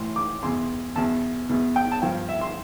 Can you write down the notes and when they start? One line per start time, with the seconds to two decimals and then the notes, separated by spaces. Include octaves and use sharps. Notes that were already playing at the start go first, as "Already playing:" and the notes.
Already playing: A2 E3 C6
0.16 D6
0.43 E2 B2 C6
0.96 E2 B2 A5
1.49 E2 B2
1.76 G5
1.92 A5
2.02 G2 F3 G5
2.29 E5
2.41 C6